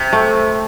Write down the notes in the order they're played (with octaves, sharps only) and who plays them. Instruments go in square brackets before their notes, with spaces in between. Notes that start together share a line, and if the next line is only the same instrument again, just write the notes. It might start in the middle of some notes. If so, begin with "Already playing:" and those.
Already playing: [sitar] C3
[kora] A3